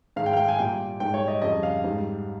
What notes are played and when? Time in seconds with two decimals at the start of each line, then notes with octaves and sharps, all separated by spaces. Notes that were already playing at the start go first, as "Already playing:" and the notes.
0.16 G#2 D#3 G#3 F5
0.26 G5
0.33 F5
0.37 G5
0.48 G#5
0.59 A#2 G3 G5
1.00 G#2 G3 G5
1.14 C#5
1.28 D#5
1.42 F2 C#3 G3 D#5
1.63 F5
1.84 G#2 G3